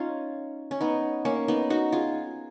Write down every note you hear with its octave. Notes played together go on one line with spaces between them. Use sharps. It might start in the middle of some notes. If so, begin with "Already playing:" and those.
Already playing: C#4 D#4 F4
C#4
B3 D#4
A#3 C#4
B3 D#4
D#4 F#4
F4 G#4